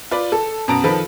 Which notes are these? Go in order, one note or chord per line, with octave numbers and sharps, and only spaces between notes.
F4 B4 D5
A4
F#2 B2 B3 A5 A#5 D7
D#3 F3 A4 B4